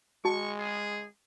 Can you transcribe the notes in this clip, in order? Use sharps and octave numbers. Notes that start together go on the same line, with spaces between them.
G#3 F#4 A5 C#6
G#4